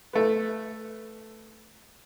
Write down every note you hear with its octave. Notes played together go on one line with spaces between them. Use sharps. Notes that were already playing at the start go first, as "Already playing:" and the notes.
A3 B3